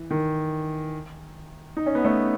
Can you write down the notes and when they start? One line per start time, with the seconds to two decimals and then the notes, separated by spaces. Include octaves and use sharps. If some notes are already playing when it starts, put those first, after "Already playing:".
Already playing: E3
0.10 D#3
1.77 D#4
1.86 C#4
1.95 B3
2.04 A3 C#4